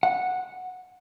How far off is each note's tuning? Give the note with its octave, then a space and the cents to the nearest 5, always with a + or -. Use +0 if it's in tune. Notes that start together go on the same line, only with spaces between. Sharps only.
F#5 -10